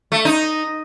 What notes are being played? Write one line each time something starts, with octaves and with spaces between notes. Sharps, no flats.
A3
D#4